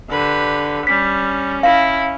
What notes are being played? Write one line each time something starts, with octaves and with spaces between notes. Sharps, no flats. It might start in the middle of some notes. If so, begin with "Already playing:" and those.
D3 G4 B4
G3 C#4 B6
E4 F5